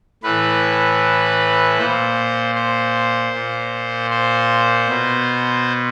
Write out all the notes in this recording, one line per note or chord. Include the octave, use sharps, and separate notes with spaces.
A2 E3 B4
A#2 C5
C5
A#2
C5
B2